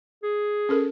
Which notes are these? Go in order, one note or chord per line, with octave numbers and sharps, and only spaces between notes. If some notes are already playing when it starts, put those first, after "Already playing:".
G#4
C#4 A4 A#4